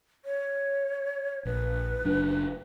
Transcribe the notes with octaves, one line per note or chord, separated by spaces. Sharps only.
C#5
A#1 B4
F#1 F#3 D4